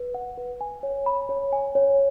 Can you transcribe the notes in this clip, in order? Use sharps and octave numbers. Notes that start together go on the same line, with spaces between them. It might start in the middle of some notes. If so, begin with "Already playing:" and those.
Already playing: B4
F#5
B4
G#5
C#5
B5
C#5
G#5
C#5